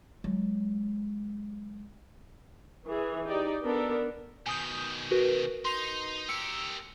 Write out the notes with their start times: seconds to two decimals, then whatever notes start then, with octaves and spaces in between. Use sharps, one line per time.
0.24 F#3 G#3
2.86 E3 G#4
3.27 D#4 G4 D5
3.64 B3 D4 A4 A#4
4.46 B2 D#3 G#5 D#6 G6
5.11 F#4 A#4 B4
5.65 D#4 C6 C7 F7
6.29 G4 A#4 E6 C#7